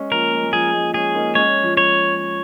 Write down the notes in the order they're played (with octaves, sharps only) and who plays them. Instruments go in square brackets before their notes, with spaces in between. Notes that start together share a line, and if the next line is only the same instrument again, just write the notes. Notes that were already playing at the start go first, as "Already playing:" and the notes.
Already playing: [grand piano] G#3 C#4
[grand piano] F3 A#3 [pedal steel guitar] A#4
[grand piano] G#3
G#3
[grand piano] F3 [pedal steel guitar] G#4
[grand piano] G#3
[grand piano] G#3 C#4 [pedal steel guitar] G#4
[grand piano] A#3 D#4
[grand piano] G#3 C#4 [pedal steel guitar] C#5
[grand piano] F3
[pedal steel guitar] C#5